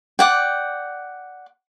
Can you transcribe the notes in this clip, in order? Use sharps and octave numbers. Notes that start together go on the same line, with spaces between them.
D5 F#5 G5